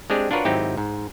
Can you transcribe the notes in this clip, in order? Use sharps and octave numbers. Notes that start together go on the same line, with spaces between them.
G#3 C4 D4 G4 G#4
D4 F4 F#4 A#4 B4 C#5
G#1 F#3 C4 D#4 E4 G4
G#2